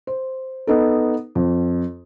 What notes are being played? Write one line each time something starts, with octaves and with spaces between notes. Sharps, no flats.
C5
B3 D#4 A4
F2